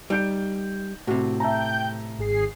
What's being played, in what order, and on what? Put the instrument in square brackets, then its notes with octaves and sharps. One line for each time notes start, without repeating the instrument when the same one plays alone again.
[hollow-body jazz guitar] G3 [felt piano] D#4 G6 D7
[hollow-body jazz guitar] A2 C3 [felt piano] F#4
[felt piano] E5 A5 A#5 [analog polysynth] G5 G6
[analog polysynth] G#1 G#4 C7